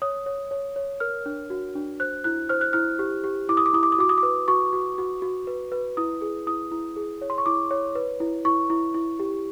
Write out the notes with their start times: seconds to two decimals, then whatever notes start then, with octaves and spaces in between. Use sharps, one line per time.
0.02 C#5 D#6
0.26 C#5
0.51 C#5
0.76 C#5
1.00 A#4 F6
1.26 D4
1.50 F#4
1.75 D4
2.00 C5 F#6
2.24 E4 F#6
2.49 C5 F6
2.61 F#6
2.73 E4 F6
2.99 G4
3.24 G4
3.49 E4 D6
3.57 D#6
3.66 D6
3.73 E4 D#6
3.83 D6
3.92 D#6
3.99 F#4 D6
4.09 D#6
4.18 D6
4.23 B4
4.48 F#4 C#6
4.73 F#4
4.98 F#4
5.22 F#4
5.47 B4
5.72 B4
5.97 E4 D#6
6.22 G#4
6.47 E4 D#6
6.72 E4
6.96 G#4
7.22 C#5
7.30 C6
7.38 C#6
7.46 E4 D6
7.71 C#5
7.95 B4
8.20 E4
8.45 E4 C#6
8.70 E4
8.94 E4
9.19 G4